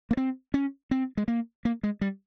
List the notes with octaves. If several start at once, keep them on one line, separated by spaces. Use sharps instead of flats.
A#3
C4
C#4
C4
G#3
A#3
A#3
G#3
G3